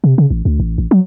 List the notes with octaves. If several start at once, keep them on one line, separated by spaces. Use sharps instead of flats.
C3
C#3
A1
D2
A1
A1
F#3